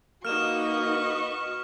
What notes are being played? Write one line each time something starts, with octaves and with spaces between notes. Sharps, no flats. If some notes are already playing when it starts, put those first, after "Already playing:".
A#3 D#4 F#4 B4 D#5 C#6 F6 E7